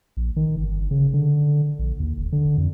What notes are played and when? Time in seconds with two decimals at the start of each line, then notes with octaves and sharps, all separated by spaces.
0.17 A#1
0.36 D#3
0.57 G1
0.91 C#3
1.14 D3
1.79 A#1
2.00 D#2
2.18 F1
2.32 D3
2.58 F2